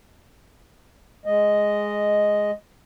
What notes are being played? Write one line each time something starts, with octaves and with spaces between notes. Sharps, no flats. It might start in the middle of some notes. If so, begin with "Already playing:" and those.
G#3 D#5